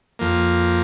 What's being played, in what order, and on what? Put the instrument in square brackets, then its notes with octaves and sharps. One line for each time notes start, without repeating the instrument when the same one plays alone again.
[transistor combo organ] F2 F3 A#3